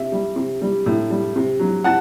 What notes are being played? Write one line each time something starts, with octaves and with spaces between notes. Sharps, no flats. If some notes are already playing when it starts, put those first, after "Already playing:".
Already playing: C3 E5
G3
C3
G3
A2
G3
C3
F#3
C3 F#5 A5